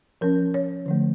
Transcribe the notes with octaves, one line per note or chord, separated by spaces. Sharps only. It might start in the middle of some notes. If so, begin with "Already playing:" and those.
F3 C#4 A#4
C#5
D3 F3 A3